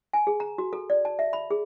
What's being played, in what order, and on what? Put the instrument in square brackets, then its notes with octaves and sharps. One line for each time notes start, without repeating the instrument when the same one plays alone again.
[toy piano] G#5
G#4
A#5
F#4
A4
D5
A5
E5
B5
G#4